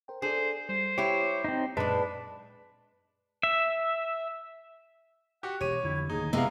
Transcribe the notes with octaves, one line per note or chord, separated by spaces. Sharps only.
A#4 C5 G5
D4 G#4 A4 C5 D5
G3 C5
E4 G4 C#5
C4 D#4
F#2 A#2 G#3 D4 B4 A5
E5
F#4 G4 F#5
E1 G4 C#5 D#7
F2 D3 E3 E4
D1 D#2 D#4 G#4
F1 C3 G#3 B3 E4 A#4 E5 F5